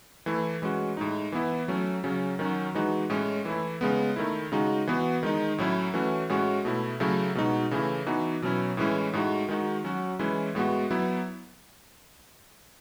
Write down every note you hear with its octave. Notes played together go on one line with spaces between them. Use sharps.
E3 A3 E4
E3 G#3 C#4 F#4
A2 G#3 D#4
E3 B3 E4
F#3 A3 C#4
C#3 F#3 C#4
D#3 F#3 C#4 F#4
E3 G#3 D#4 F#4
A2 G#3 C#4
E3 A3 E4
C#3 G#3 B3
D#3 A3 E4
C#3 G#3 D#4 F#4
E3 B3 F#4
D#3 G#3 D#4
A2 F#3 C#4 E4
E3 A3 C#4 F#4
A2 G#3 C#4 F#4
B2 A3 E4
C#3 F#3 A3 E4
B2 G#3 D#4 F#4
C#3 E3 A3 E4
E3 B3 D#4 F#4
B2 F#3 C#4 E4
A2 E3 G#3 C#4 E4
A2 G#3 D#4 F#4
D#3 G#3 D#4 F#4
F#3 C#4 F#4
E3 G#3 C#4 E4
A2 G#3 B3 F#4
F#3 B3 E4